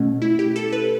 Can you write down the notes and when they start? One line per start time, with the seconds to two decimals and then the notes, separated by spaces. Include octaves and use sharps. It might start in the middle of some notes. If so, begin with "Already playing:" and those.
Already playing: B2 A3 C#4
0.22 E4
0.39 G4
0.56 A4
0.73 B4